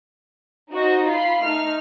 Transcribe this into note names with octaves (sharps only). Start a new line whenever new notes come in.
D#4 F#4 C5 D#5
F4 B5 C7
A3 D#4 F6